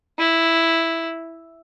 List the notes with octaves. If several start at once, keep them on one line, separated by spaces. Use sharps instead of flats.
E4